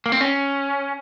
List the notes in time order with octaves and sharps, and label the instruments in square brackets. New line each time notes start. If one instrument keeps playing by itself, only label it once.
[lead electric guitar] A#3
C4
C#4